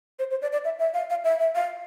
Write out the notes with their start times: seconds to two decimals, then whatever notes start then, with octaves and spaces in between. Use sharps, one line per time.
0.19 C5
0.31 C5
0.42 D5
0.53 D5
0.65 E5
0.79 E5
0.94 F5
1.10 F5
1.24 E5
1.39 E5
1.55 F5